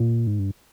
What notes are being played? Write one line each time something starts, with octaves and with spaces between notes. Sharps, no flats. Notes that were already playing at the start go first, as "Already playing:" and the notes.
Already playing: A#2
G#2
G2